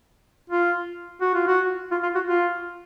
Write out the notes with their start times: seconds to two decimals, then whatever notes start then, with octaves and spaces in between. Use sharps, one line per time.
0.50 F4
1.21 F#4
1.34 F4
1.47 F#4
1.91 F4
2.03 F4
2.15 F#4
2.27 F4